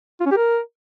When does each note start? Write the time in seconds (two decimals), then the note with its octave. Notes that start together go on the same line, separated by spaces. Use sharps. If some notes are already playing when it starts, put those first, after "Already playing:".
0.20 F4
0.26 C#4
0.31 G4
0.37 A#4